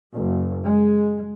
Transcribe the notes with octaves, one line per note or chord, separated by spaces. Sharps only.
F#1
G#3